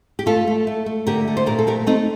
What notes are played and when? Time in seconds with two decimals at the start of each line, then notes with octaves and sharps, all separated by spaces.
0.19 G4
0.26 A3 F4 A4
0.47 A3
0.67 A3
0.86 A3
1.07 D3 G4 A#4
1.28 A3
1.37 C5
1.46 A#2 G4 A#4
1.59 A4
1.67 A3 G4 A#4
1.87 A3 C4 D#4